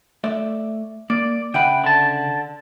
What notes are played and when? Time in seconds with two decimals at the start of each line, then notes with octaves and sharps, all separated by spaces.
0.24 A3 D5 E5
1.10 A#3 D5
1.54 C#3 B4 E5 F#5 G5
1.84 D3 A5